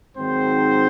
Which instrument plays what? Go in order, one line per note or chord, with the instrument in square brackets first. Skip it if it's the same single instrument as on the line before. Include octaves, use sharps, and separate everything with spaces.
[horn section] G#2 D#3 F#3 C4 C5